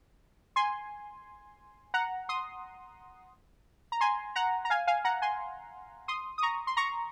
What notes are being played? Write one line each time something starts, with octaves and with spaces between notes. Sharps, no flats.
G#5 C6
F#5 A#5
C6 D#6
A#5
G#5 C6
F#5 A#5
A#5
F5 G#5
F5 G#5
F#5 A#5
G#5 C6
C6 D#6
D#6
A#5 C#6
C6
A#5 C#6